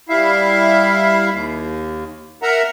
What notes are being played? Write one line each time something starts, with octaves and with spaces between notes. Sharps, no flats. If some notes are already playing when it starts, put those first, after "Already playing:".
G3 E4 E5 F5
D#2
A#4 E5 F#5 A#5